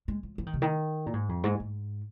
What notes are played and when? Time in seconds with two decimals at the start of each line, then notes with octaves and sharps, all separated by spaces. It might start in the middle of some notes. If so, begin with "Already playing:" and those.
0.08 G#3
0.23 F3
0.38 F3
0.47 D#3
0.54 C3
0.62 D#3
1.06 A#2
1.13 G#2
1.29 F2
1.44 G#2
1.60 G#2